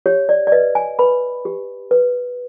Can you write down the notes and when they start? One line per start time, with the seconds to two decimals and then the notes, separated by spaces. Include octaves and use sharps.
0.06 G4 C#5
0.29 D5
0.47 D5
0.52 B4 D#5
0.75 G#5
0.99 B4 B5
1.45 G4
1.91 B4